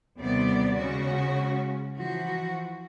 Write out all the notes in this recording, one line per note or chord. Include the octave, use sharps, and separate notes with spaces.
D#2 C3 G3 B3 D5
C#3 G#3 C#4 F#4
E3 F3 F#4